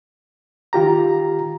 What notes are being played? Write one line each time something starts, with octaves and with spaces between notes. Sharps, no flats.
D#3 F4 G4 A#5